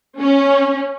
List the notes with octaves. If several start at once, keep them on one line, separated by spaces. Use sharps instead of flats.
C#4